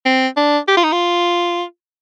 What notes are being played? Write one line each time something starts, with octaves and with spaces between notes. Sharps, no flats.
C4
D4
G4
F4
D#4
F4